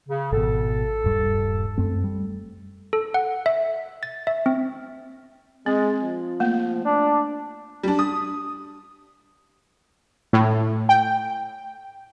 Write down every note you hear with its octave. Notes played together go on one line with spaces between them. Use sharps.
C#3
G#1 B2 A4
D#1 G2 G3
F#2 A3 C4
G3
A4
F#5
E5
A6
E5
C4
G#3 C4
F3
A3 A#3
D4
G3 D4
D#6
A2
G5